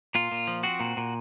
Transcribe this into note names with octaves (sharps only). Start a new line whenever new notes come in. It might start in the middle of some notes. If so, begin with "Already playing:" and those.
A#2 F4
A#2
F3
C4 F#4
A#2
A#2